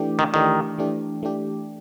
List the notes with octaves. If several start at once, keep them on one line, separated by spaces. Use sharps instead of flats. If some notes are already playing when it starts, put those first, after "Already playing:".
Already playing: E3 A3 D4 G4
D#3
D#3 E3 A3 D4 G4
E3 A3 D4 G4
E3 A3 D4 G4